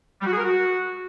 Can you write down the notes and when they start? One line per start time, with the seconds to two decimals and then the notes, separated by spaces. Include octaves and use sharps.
0.21 G3
0.26 F#4
0.32 G#4
0.38 A#4
0.43 F#4